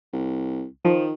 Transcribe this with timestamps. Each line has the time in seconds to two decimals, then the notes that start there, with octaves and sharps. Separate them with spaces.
0.13 C2
0.85 D#3 F3